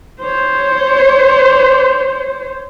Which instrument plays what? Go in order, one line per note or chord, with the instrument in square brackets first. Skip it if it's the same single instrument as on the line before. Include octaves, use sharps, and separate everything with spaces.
[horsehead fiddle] C5 C#5